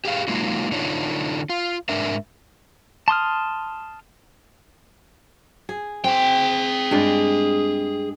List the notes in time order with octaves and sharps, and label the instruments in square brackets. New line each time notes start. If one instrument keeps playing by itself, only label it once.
[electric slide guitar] G4 G#4 F5
F#3 G#3 A#3 D#4 F4
D3 D4 D#4 F4 C#5
F4
G#2 G#3 D4 A#4 E5
[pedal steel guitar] A5 C6 D#6 F6
[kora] G#4
[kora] C4 [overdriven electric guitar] G#4 G5
[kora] G2 G#3 D5